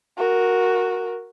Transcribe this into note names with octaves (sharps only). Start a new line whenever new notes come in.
F#4 A#4